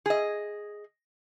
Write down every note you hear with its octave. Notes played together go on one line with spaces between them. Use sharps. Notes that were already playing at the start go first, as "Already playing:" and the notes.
G#4 D#5